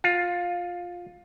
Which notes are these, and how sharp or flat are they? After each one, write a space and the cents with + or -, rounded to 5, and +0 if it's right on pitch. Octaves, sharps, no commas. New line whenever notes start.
F4 +15